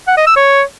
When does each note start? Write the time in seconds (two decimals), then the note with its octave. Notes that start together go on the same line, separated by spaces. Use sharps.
0.08 F#5
0.17 D#5
0.27 E6
0.36 C#5